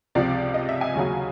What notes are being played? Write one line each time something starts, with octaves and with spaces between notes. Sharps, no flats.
C#2 C3 F3 D5
D#5
E5
G#5
D#2 C#3 F#3